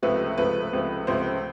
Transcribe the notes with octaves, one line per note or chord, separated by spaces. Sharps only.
C#2 C3 F3 A3 B4
C#2 C3 F3 A3 B4
C#2 C3 F3 A3
C#2 C3 F3 A3 C5